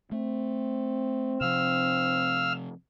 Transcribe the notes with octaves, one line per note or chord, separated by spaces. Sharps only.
A3 C4
C3 F3 F5 E6 F6